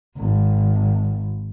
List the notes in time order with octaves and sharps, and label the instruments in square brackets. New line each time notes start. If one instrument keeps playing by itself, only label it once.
[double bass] G#1